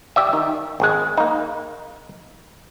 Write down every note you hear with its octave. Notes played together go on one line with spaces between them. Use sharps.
G4 D5 E5
D#3
G#1 G#3
A#3 D#4